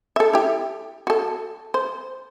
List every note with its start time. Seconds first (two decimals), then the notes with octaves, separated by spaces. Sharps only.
0.16 A4 E5
0.33 E4 G4
1.07 F#4 A4
1.74 C5